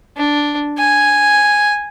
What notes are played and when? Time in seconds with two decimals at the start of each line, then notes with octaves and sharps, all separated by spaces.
0.16 D4
0.78 G#5